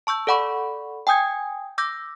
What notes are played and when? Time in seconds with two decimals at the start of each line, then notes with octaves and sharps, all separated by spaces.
0.07 A5 C#6 E6 G6
0.27 A4 D5 F#5 B5 C#6
1.07 G5 G#5 D#6 G6 G#6
1.78 D6 E6 G6 A#6